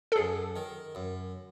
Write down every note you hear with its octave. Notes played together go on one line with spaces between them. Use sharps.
A4
F#2 G#4
D#3
F#2